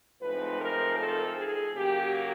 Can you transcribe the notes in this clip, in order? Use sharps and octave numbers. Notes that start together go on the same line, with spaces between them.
A2 F3 G#3 C4 D#4 B4
A#4
A4
G#4
C#3 F#3 A#3 G4